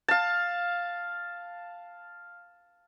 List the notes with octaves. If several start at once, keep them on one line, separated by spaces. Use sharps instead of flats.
F5 A5